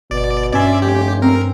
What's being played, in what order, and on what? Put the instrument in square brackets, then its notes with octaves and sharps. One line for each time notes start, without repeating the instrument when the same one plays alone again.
[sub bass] G1 [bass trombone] B2 [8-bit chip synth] D5
[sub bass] G2 [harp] C#4 G#5 C6 [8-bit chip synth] D5 E5
[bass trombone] F1 [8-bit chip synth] G4 [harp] G#5
[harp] C4 [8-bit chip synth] A#4